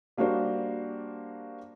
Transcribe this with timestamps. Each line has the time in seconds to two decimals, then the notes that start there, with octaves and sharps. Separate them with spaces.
0.18 G3 A#3 D4 F#4 C5